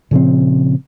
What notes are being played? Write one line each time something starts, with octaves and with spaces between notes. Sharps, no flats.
A#2 C#3 F3 C4